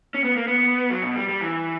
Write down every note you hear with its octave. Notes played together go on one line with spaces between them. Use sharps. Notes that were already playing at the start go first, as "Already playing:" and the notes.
C#4
B3
A#3
B3
F#3
B2
G3
G3
E3